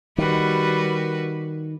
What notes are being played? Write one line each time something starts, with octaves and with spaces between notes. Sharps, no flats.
D#3 G3 F#4 B4